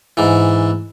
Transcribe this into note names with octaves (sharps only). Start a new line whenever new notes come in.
G#2 E3